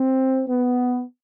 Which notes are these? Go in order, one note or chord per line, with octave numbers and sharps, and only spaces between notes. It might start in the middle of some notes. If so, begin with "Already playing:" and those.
Already playing: C4
B3